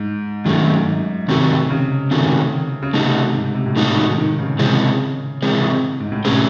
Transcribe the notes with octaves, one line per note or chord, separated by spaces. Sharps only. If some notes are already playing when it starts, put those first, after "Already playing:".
Already playing: G#2
F#2 D#3 A3 C#4
F#2
G#2
C3 D#3 A3 C4 D#4 F#4
C#3
D#3 A3 C4 D#4 F#4
C#3
C3 A3 D#4 F#4
G#2
C3
A2
G#2 A3 D#4 F#4
D#3
D#3
C#3
C3 E3 G#3 C4
C3 E3 G#3 C4
G#2
A2
C3 A3 C#4 G#4 C5